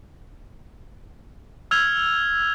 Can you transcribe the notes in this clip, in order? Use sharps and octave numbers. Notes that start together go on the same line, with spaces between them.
E6 F6 G#6 F7